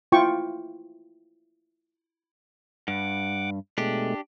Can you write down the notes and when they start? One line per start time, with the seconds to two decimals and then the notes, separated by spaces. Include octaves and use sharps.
0.12 E4 F4 G5 C#6
2.88 G2 F#5 D6
3.78 B2 G#3 A3 D4 G4